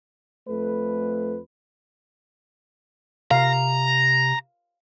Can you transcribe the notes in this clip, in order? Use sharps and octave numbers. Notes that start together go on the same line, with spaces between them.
F2 A3 B4
C3 F5 A#5